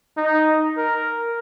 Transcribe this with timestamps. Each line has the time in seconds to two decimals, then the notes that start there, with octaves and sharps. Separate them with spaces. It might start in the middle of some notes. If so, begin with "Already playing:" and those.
0.17 D#4
0.77 A#4